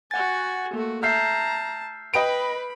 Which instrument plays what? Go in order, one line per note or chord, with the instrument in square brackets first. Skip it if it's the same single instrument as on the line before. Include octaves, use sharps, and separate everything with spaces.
[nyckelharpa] F#4 G#5 [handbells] F#5 A6
[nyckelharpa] A3 F#4 [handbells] A#3
[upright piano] E5 [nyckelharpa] A5 [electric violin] A#5 [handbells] F6 G6 C7
[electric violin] B4 [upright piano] D#5 G5 D7 [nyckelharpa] B5